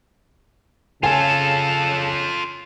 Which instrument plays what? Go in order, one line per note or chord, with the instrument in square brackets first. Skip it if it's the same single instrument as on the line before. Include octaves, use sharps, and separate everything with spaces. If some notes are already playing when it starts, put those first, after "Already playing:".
[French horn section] C#3 [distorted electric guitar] F4 A4 [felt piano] G#5 [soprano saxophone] A5